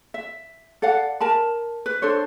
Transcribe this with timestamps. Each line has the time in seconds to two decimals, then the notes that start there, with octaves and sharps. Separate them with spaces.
0.14 E5
0.82 A4 D5 F5 F#5
1.21 A#4 A5 B5
1.86 B4
2.02 D4 A4 C5 C#5